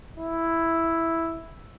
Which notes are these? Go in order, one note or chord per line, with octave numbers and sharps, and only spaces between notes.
E4